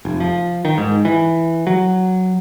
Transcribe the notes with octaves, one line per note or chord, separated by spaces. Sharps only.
F1
F3
D#3
G#2
E3
F#3